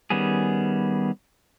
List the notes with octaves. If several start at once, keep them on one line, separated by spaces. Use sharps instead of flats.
D#3 G3 B3 C#4 G#4